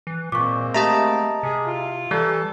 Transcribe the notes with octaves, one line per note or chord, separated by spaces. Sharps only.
E3
A#2 G#3 A#3 C4 C#6 D6
A3 G4 D#5 E5 A5 A#5
C3 G#4
E4 F4
E3 G3 A4